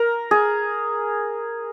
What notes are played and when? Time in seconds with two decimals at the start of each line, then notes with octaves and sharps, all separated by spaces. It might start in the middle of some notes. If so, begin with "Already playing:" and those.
Already playing: A#4
0.31 G#4